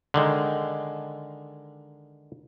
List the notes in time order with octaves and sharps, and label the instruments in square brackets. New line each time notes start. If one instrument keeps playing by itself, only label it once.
[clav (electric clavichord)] D3 D#3 G#3